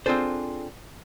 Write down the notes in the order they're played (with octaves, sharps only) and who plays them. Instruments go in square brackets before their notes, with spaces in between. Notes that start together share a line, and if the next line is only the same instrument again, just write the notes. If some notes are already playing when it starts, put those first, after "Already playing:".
[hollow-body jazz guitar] C4 D4 F4 G#4 A4 C5